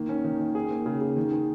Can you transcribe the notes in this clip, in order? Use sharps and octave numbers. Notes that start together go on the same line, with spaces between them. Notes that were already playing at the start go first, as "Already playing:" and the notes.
Already playing: D#3 A#3
C#4
D#3
D#3
G#4
A#3
C#3
C#3
D#3
G#4